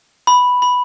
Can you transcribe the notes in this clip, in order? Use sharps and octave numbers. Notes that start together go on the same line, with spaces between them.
B5
B5